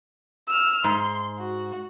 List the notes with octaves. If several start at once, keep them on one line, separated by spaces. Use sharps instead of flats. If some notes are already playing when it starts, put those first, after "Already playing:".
E6 F6
G#2 C6
F#4